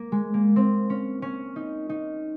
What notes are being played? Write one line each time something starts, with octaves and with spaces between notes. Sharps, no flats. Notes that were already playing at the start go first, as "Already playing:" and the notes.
Already playing: A#3
G#3
A#3
C4
C#4
C#4
D#4
D#4